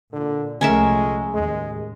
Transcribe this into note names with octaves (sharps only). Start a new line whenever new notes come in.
A#2 D3
C2 F3 G#3 A3 C#4 A#4 E5
D#2 A2 G#3